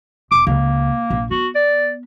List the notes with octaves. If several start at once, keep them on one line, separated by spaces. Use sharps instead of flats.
E1 D6
C#2 A#3
A#1
B3 F#4
D5